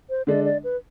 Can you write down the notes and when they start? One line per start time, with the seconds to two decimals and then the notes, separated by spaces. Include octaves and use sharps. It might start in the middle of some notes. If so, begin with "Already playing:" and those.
0.10 C5
0.27 D3 G#3 D4 D5
0.45 D5
0.64 B4